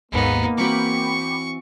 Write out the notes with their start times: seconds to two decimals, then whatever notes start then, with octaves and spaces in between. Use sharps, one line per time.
0.12 G#1 D#2 G#2 A#3 B3 D#4
0.58 E3 C4 F#4 G5 B5 C#6 D6